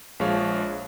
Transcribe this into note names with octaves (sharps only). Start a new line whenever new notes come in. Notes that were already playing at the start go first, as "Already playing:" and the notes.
A#1 F3 G#3 C#5 F5